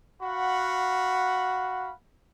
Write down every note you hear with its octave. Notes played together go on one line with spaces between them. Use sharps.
F#4 F5 F#5 B5